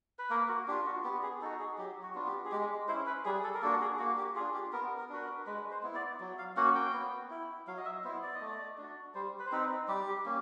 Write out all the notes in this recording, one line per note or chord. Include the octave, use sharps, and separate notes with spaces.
B4
A#3 A#4
F#4
D4 F4 G4
F#4
B3 G4
G#4
D#4 F#4 A4
G#4
F#3 G4
F#4
B3 D4 F4
G4
G#4
G#3 G4
C#4 E4 C5
B4
G3 G#4
A4
A#4
A#3 D4 F#4 A4
G#4
A#3 F#4
G4
D4 F4 G#4
G4
B3 A#4
A#4
D4 F#4 B4
A#4
G#3 B4
C5
B3 E4
D5
F#3
F5
A#3 C#4 F#4 F#5
G5
B3
E4
F#3 F5
D#5
E5
B3 E4 C5
D5
D#5
A3
D5
D4 F#4
G3 C5
B4
C5
C4 D#4 B4
G3 G4
A#3 C#4